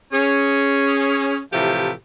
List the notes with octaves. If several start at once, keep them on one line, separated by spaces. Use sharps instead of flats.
C#4 G#4
A2 C3 E3 F3 G4 E5